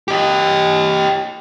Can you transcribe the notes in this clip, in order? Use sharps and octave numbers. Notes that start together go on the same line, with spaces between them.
G4 D#5